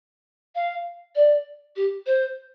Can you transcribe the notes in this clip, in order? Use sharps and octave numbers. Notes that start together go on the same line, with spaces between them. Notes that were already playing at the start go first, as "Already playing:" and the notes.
F5
D5
G4
C5